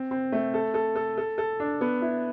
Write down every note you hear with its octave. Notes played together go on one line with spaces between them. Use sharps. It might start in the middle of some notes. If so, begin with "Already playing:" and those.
Already playing: C4
C4
A3
A4
A4
A4
A4
A4
D4
B3
E4